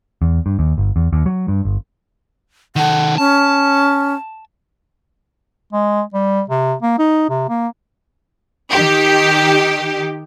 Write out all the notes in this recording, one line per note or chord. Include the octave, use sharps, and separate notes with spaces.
E2
G2
D#2
G1
E2
D#2
F#3
G2
G1
D#3 A4 F#5
C#4 A5
G#3
G3
C3
A#3
D#4
C3
A#3
D#3 G4